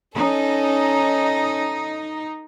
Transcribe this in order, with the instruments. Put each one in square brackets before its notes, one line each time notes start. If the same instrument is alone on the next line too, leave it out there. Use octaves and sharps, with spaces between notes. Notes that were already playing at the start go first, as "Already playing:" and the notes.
[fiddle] C#4 A4 [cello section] D#4